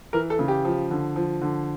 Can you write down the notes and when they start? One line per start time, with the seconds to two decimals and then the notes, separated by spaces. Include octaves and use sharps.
0.13 E3 A#4
0.30 A4
0.39 C#3
0.48 G4
0.65 F3
0.91 D3
1.16 F3
1.42 D3